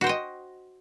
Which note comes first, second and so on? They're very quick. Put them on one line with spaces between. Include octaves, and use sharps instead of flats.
F#4 C5 G5 D#5